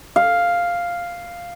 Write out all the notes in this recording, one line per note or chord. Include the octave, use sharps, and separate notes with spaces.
F5